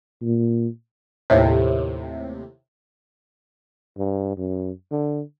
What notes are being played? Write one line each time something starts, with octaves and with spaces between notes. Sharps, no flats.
A#2
D#2 A2 C3
G2
F#2
D3